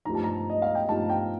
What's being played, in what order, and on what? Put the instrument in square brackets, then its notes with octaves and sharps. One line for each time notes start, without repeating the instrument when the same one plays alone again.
[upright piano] G2 F3 A3 D#4 A#5
A5
A#5
D#5
F5
G5
G2 F3 A3 D#4 A5
G5